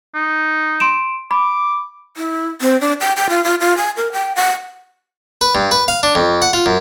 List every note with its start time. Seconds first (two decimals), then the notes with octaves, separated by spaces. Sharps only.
0.15 D#4
0.80 C6 D7 E7
1.31 B5 D6
2.17 E4
2.61 C4
2.81 D4
3.01 G5
3.17 G5
3.30 F4
3.44 F4
3.61 F4
3.78 G#5
3.97 A#4
4.12 G5
4.36 F#5
5.41 B4
5.55 G2
5.71 B4
5.88 F5
6.03 D4
6.15 F2
6.42 F#5
6.53 F4
6.66 F#2